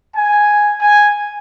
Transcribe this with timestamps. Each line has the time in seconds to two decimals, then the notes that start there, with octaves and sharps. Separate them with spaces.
0.16 G#5
0.81 G#5